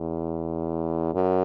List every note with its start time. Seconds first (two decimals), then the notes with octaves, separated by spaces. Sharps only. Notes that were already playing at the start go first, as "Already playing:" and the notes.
Already playing: E2
1.14 F#2